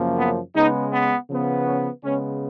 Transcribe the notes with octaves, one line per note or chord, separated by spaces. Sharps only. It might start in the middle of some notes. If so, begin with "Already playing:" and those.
Already playing: F#2 C#3 F3 A#3
B3
C#3 G#3 B3 D#4
B3
C#3 F3 B3
C#4
C#3 G#3 B3 C#4